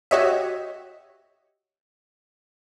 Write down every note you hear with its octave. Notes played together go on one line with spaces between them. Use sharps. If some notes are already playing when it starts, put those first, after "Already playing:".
F#4 G4 C#5 D#5 E5